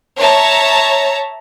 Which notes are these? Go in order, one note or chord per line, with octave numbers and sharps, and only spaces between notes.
C#5 E5 A5 A#5